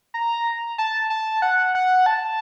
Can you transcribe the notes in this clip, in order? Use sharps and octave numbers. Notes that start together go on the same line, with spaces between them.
A#5
A5
A5
F#5
F#5
A5